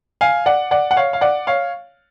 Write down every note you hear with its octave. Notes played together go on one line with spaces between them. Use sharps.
F5 G#5
D5 F#5
D5 F#5
F#5
C#5 F5
F5
D5 F#5
C#5 F5